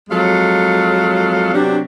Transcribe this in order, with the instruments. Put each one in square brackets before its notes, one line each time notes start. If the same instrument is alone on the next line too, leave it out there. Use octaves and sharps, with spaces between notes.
[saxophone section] F2 F#3 G#3 A4 F5
C3 F#3 B3 D4